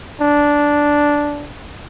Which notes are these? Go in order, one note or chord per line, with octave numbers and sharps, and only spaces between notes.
D4